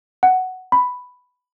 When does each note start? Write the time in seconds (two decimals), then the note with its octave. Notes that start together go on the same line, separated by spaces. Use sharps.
0.23 F#5
0.72 B5